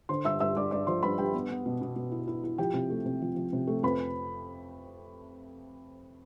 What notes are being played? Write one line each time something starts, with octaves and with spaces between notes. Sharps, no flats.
D3 C5 C6
G2 E5 E6
G2 E5 E6
G2 D5 D6
G2 D5 D6
F3 C5 C6
G2 B4 B5
G2 G4 G5
B3
B3
B2
B2
B2
E4
E4
E4
F3 G4 G5
C3
A3
C3
F3
F3
C3
A3
F2 B4 B5